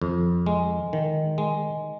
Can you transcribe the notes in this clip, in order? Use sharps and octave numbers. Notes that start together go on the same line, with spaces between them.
F2
G#3
D#3
G#3